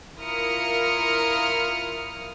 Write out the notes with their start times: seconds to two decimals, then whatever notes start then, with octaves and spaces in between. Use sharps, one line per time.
0.19 E4 F4 A#4 D#6 F6 C#7